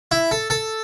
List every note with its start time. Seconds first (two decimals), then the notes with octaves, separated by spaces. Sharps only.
0.11 E4
0.31 A4
0.50 A4